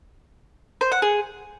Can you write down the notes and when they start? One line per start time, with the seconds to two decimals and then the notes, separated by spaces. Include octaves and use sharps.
0.81 C5
0.92 F#5
1.02 G#4